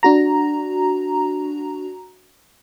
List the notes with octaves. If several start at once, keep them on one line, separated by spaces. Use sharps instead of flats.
D4 F#4 A#5